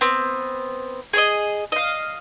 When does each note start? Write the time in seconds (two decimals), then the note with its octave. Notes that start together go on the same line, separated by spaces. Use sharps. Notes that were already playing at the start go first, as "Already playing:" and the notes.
0.01 B3 C4
1.13 G#4 C#5 D#5
1.72 D#5 F5